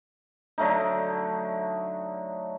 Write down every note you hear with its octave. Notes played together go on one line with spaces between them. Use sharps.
D3 F#3 A3 D#4